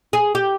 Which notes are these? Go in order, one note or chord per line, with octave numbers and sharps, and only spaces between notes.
G#4
G4